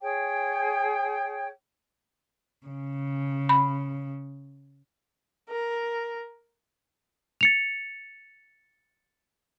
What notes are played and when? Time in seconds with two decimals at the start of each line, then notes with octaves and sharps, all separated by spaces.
0.01 G#4 C#5 G5
2.67 C#3
3.49 B5
5.49 A#4
7.41 A6 C#7 F7